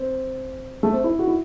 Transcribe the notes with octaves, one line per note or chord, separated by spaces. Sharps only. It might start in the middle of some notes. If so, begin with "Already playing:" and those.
Already playing: C4
A3
C4
E4
F#4
E4